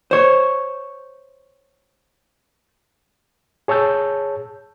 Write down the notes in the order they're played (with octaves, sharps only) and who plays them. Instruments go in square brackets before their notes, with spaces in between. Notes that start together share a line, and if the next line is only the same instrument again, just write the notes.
[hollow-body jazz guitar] C5 C#5
[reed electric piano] G#4 C#5 A5 E6 G6